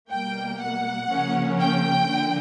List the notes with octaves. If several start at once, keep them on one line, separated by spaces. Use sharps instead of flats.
B2 G3 A#3 G5
F#5
C#3 F3 A#3 C#4
G5
D3 F3 A#3